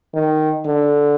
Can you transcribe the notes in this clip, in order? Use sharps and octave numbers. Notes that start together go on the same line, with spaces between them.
D#3
D3